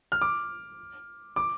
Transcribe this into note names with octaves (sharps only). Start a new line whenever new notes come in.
F6
D6
D6